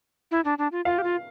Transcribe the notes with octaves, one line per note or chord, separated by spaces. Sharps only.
E4
D4
D4
F4
F4 F5
G4
F4